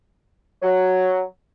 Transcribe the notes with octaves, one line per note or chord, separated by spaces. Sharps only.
F#3